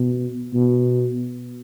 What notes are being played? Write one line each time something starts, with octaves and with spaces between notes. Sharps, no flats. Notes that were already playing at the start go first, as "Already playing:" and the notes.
Already playing: B2
B2